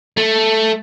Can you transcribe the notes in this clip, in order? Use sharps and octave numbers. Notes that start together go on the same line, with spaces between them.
A3